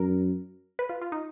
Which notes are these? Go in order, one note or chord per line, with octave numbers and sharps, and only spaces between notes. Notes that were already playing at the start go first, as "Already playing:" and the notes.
Already playing: F#2 A#4
B4
F4
F4
D#4